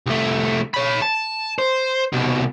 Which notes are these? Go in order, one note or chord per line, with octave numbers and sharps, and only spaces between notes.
C2 A3
C#5 B5
A5
C5
C2 B2